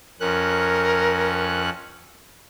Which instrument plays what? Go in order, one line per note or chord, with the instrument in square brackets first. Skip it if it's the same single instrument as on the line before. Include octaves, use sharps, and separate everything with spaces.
[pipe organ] F2 C#4 F#6 [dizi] A#4